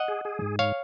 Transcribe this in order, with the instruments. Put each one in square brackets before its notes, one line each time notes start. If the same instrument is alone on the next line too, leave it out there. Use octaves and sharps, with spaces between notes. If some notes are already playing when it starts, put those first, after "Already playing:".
Already playing: [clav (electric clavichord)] D#5 F#5
[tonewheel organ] G#4
G#4
G#2
[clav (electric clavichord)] C#5 F5